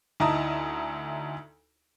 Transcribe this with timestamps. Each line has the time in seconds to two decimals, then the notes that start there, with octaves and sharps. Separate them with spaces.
0.20 D2 D#4 E4 A5 A#5 D#6